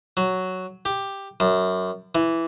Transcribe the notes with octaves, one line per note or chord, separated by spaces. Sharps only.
F#3
G4
F#2
E3